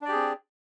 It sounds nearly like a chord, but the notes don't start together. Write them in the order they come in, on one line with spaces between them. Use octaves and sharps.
D4 D5 G4 G#4 C4